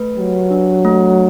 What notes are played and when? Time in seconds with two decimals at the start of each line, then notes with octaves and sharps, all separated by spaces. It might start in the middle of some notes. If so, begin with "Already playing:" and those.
Already playing: A3 B4
0.17 F#3 G4
0.51 D4
0.85 A3